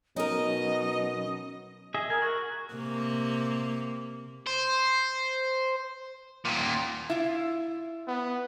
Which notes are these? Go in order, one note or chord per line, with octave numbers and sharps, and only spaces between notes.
B2 F#3 C#4 D#4 A#4 D#5
G#4 D#5 E5
A#4 G#5
F#4
C3 A#3
C5
D#2 A#2
E4 F4
B3